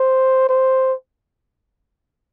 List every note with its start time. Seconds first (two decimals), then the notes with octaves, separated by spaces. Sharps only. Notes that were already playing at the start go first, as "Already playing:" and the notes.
Already playing: C5
0.49 C5